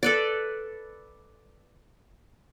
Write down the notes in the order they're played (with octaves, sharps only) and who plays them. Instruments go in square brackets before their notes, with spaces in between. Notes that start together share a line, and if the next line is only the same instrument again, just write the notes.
[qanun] A4 B4 D5